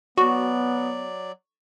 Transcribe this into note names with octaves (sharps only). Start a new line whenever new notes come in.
F#3 B3 F#4 D5 C#6